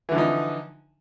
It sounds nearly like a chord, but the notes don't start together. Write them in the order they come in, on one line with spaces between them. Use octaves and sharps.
E3 D3 F3 D#4